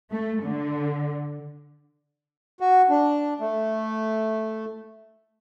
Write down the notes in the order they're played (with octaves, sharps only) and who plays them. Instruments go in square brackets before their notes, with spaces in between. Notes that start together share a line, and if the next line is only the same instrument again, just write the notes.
[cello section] A3
D3
[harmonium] F#4
D4
A3